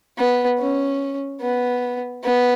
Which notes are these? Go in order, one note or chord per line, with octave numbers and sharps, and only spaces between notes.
B3
C#4
B3
B3